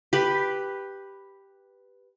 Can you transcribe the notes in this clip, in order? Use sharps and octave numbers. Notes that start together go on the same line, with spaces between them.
G4 B4